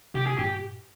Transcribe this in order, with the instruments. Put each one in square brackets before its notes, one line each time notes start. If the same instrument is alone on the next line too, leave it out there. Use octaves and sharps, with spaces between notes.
[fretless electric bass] C3 D#3 [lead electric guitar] G4
[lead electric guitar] G#4
[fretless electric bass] G2 A#2 [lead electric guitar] G4